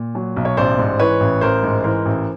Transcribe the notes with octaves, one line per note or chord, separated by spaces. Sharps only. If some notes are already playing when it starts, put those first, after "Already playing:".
Already playing: A#2
F#3
B1
C#5
A1 C5 D5
G#2
E3 B4 C#5
A1
A1 A#4 C5
G#2
E3 A#4 C5
A1